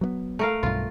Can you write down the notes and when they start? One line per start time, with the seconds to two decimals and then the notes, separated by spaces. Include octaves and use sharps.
0.01 F#3 A#3 B3
0.39 A3 A#4 F5
0.63 B1 G2 F4